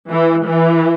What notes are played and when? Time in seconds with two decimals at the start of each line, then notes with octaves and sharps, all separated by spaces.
0.09 E3
0.47 E3